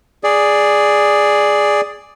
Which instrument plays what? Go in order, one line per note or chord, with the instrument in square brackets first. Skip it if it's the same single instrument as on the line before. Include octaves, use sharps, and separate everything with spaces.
[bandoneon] G#4 D5